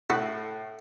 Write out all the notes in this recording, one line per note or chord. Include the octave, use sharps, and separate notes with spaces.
A2 E4 F#4 A4 E5 F#6